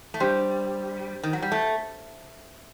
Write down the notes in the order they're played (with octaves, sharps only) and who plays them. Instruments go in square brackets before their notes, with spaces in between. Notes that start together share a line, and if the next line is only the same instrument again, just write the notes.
[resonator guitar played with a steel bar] A3
[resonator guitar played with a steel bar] G3 [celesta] D4 G4 C5 G5 C6
[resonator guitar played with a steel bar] D#3
F#3
G3
A3